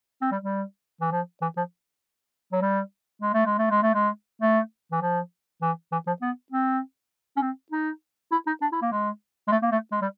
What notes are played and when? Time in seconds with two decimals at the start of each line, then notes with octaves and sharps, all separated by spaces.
0.22 C4
0.32 G3
0.42 G3
1.01 E3
1.12 F3
1.42 E3
1.57 F3
2.52 F#3
2.62 G3
3.22 G#3
3.34 A3
3.46 G#3
3.58 A3
3.70 G#3
3.83 A3
3.94 G#3
4.42 A3
4.92 E3
5.02 F3
5.62 E3
5.92 E3
6.07 F3
6.22 B3
6.52 C4
7.37 C#4
7.41 C4
7.72 D#4
8.32 E4
8.47 D#4
8.62 D4
8.72 E4
8.82 A#3
8.92 G#3
9.48 G#3
9.52 A3
9.62 A#3
9.72 A3
9.92 G#3
10.02 G3